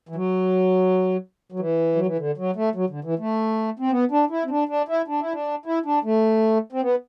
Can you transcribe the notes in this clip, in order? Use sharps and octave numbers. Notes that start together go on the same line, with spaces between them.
E3
F#3
F#3
E3
F#3
E3
D3
F#3
A3
F#3
D3
E3
A3
C4
B3
D4
E4
C4
D4
D4
E4
D4
E4
D4
E4
D4
A3
C4
B3